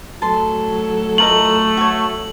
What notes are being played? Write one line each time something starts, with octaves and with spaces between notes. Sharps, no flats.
A2 F#3 A4 A5 C6
A3 F4 A#4 D#5 F#7
F#4 C#5